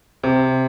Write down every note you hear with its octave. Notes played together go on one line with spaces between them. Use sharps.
C3